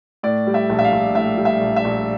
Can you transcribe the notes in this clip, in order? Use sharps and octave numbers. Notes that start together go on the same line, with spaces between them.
A2 D5
G3
E5
A#1
E5
F5
A#1
A2 E5
G3
E5
A#1
E5
A#1